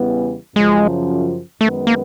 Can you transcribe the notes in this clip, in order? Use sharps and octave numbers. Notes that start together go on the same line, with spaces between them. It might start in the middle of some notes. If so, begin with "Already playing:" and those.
Already playing: E2 C#3 E3 G3 B3
F#2 C#3 F3 G#3
F#2 D#3 G#3 A3 B3
A#3